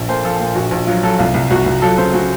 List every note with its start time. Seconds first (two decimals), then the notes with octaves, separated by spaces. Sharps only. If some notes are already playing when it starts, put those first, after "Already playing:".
Already playing: A#1
0.08 A#2 A4 C5
0.24 F3 F4 A4
0.40 A#2
0.55 A#1 F#4
0.71 A#1
0.87 F#3 F4
1.03 F#3 F4 A4
1.19 C2 F4
1.34 C2
1.51 C2 F#4
1.66 C2
1.82 F#3 F4 A4
1.97 C#3 A4 C5
2.13 C#3 F#4